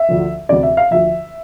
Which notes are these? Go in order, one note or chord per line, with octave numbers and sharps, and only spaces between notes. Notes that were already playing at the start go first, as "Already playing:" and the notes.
Already playing: E5
D2 D3 F3
D2 C3 E3 D5
E5
F5
D2 D3 F3 E5